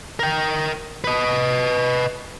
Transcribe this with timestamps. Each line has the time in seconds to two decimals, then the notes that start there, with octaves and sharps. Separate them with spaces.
0.19 A#4 G5
1.04 B4 D#5